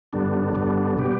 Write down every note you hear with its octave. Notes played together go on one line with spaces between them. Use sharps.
G2 D3 G3 B3 D4
G2 D3 G3 B3 D4
B2 G3 B3 G4